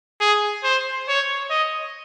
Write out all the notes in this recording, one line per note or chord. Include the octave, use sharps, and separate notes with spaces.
G#4
C5
C#5
D#5